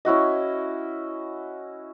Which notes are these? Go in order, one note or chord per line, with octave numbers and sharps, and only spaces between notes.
C#4 E4 F#4 D#5